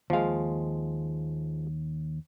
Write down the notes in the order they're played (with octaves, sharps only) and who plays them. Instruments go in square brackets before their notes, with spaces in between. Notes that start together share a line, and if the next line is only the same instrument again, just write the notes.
[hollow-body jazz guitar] D#2 F5 [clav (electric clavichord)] F3 G#3